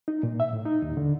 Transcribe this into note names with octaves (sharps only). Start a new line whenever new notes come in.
D#4
A#2
E5
A2
D#4
D#2
D3